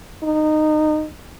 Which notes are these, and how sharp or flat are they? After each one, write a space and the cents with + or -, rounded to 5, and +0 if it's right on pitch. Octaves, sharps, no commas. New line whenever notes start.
D#4 -20